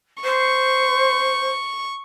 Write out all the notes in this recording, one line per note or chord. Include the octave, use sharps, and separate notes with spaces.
C5 C#6